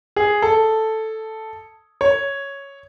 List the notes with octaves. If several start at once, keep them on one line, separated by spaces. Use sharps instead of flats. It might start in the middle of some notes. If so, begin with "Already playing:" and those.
G#4
A4
C#5